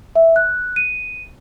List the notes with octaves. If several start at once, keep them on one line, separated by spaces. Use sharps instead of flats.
E5
F#6
D#7